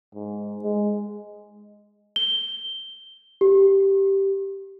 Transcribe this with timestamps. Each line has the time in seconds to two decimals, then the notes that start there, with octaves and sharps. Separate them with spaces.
0.15 G#2
0.63 G#3
2.16 G7
3.41 G4